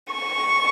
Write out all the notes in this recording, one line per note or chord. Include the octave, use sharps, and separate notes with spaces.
C#6